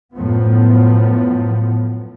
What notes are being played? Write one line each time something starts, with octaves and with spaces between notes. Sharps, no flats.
F#2 A2 F3 B3